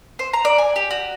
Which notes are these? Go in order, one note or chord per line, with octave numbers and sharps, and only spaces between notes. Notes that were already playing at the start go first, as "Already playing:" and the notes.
C5
A#5
D5
G#5
G4
F#4